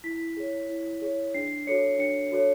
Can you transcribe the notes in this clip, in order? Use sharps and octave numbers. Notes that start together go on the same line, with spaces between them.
E4 B6
G#4 C#5
E4
G#4 C#5
D4 C7
F#4 A4 C#5 C#7
D4 C#7
F#4 A4 C#5